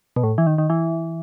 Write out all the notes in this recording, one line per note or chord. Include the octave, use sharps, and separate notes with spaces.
B2
A2
E3
D#3
D#3
E3